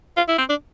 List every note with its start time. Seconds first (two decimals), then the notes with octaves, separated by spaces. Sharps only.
0.17 F4
0.29 E4
0.38 C4
0.49 D4